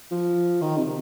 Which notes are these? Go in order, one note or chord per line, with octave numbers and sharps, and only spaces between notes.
F3
D#3
C3